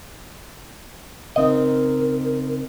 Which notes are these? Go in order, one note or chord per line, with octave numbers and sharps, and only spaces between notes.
C#3 C4 D#4 A#4 D#5